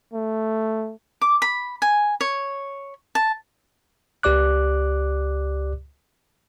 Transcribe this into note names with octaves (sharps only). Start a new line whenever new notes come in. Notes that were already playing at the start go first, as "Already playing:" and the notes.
A3
D6
B5
G#5
C#5
A5
C#2 G4 D5 D6 F#6